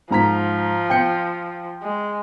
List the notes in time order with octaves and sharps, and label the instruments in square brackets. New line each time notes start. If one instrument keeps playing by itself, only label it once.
[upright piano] G#2 A#5 B6 [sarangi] F3
[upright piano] G5 G6 C#7
[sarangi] G#3